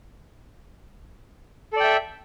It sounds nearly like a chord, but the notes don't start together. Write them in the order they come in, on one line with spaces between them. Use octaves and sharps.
A4 D5 G5 E5